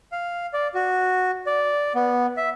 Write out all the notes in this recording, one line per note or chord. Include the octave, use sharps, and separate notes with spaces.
F5
D5
F#4
D5
B3
E5